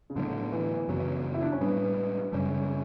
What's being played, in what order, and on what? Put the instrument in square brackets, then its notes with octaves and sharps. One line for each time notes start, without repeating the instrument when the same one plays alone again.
[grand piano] C#3
[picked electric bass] A2 F#3 B3 [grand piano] D3
[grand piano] E3
[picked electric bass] F#2 C#3 E3 B3 [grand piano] F#3
[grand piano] E4
D4
C#4
[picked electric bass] A2 G3 D4 [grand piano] B3
[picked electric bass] F#2 C#3 G3 [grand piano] C#4